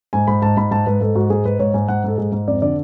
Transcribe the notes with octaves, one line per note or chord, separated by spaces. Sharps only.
G#2 G#5
G#2 B5
G#2 A5
G#2 B5
G#2 A5
G#2 B4
G#2 A4
G#2 F#4
G#2 G#4
G#2 B4
G#2 C#5
G#2 G#5
G#2 F#5
G#2 A4
G#2 G#4
G#2
F2 D5
D3 D5